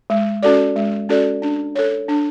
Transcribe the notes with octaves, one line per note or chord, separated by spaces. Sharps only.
G#3
C#4 F#4 A4 D5
G#3
C#4 F#4 A4 D5
D4
A4 C#5
D4